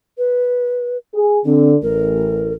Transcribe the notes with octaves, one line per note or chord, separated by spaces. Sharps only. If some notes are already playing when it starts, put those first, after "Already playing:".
B4
G#4
D3 C4
A1 A#4